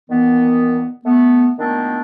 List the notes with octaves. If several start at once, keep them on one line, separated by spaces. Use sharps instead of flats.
A#2 D#3 E3 B3
A3 B3
A#2 D#3 A3 B3 C4 D4